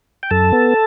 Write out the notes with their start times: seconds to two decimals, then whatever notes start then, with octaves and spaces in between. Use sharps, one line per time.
0.23 G5
0.30 F#2 A4 A5
0.53 B3